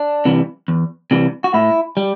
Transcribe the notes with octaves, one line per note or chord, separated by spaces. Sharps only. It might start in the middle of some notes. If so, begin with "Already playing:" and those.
Already playing: D4
C3 E3 G3
E2
C3 E3 G3
F#4
A2 E4
G3